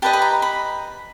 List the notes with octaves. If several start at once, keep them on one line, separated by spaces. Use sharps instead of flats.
G4 B4 D#5 A5
B5
A#5
B5